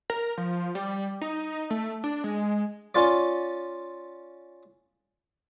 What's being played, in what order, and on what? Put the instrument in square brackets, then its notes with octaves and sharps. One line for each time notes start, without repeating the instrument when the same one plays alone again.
[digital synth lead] A#4
F3
G3
D#4
A3
D4
G#3
[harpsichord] C#4 F4 D5